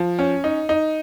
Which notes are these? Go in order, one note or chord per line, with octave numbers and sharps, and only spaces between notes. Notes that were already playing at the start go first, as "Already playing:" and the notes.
Already playing: F3
C#4
D#4
D#4